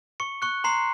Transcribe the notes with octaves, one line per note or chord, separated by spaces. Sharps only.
C#6 C#7
C#6 F#6 C#7
A#5 C6 C7